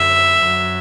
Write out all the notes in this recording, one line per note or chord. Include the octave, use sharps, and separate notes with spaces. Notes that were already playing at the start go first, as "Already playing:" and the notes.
Already playing: F#2 D3 F#3 E5
F#2 F#3